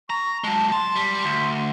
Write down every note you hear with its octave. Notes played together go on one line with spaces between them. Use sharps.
A#5 C#6
F#3 G#3 A5
A5 C6
G3
D2